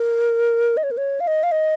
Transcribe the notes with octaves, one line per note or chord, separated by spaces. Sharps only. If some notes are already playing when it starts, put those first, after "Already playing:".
Already playing: A#4
D#5
C#5
A#4
C#5
F5
D#5
F5
D#5